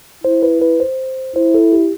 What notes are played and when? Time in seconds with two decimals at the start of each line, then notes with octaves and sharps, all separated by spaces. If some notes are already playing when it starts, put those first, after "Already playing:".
0.24 E4 C5
0.43 B4
0.62 B4
0.80 C5
1.36 E4 C5
1.54 A4
1.72 G4